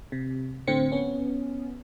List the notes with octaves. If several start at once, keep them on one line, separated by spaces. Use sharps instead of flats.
C3
A2 D3 C4 C#7
B3 C#4